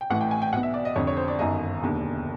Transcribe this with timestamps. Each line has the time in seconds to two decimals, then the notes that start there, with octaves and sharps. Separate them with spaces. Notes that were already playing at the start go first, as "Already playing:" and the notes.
0.01 G5
0.10 A1 A2 E3 F#5
0.21 G5
0.31 G#5
0.42 G5
0.53 B1 B2 F#5
0.63 E5
0.74 D5
0.85 D#5
0.95 F1 F2 D3 C#5
1.07 C#5
1.17 C5
1.28 D5
1.39 G1 F#2 D#3 D#5
1.82 E1 D#2 D3